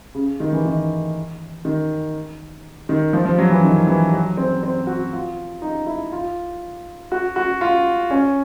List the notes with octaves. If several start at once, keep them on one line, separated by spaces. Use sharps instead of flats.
C#3
D#3
E3
D#3
D#3
D#3
F3
F3
F#3
E3
D#3
E3
F#3
C4
C4
F#4
F4
D#4
E4
F4
F#4
F#4
F4
C#4